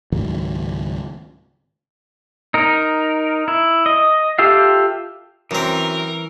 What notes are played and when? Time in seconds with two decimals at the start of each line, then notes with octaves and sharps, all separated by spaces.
0.12 C#2 G#2 D#3 F#3
2.54 D#4 A#4
3.48 E4
3.86 D#5
4.39 F4 G4 A4 E5 F5
5.51 F#2 E3 C4 A#4